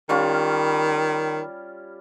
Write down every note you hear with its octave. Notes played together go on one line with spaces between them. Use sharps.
D#3 G3 C#4 F4